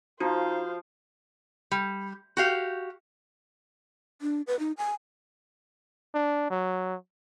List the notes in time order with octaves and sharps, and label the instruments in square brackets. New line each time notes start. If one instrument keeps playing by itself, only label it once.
[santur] F3 [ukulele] D#4 [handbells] F#4 [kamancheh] C5 F5
[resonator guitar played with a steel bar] G3
F#4 G4 F5
[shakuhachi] D4
B4
D#4
G#5
[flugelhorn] D4
F#3